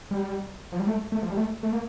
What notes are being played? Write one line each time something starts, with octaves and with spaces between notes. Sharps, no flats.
G3
F3
G3
A3
A3
F3
G3
A3
A3
A#3